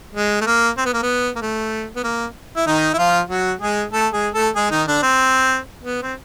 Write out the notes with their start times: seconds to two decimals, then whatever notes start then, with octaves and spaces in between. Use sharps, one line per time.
0.15 G#3
0.41 A3
0.46 A#3
0.78 C4
0.85 B3
0.93 A#3
1.02 B3
1.36 A#3
1.41 A3
1.96 B3
2.04 A#3
2.56 E4
2.67 D#3 D#4
2.94 E4
2.98 F3 F4
3.30 F#3 F#4
3.61 G#3 G#4
3.93 A3 A4
4.13 G#3 G#4
4.34 A3 A4
4.56 G#3 G#4
4.71 D#3 D#4
4.87 D3 D4
5.03 C4
5.82 B3
6.03 C4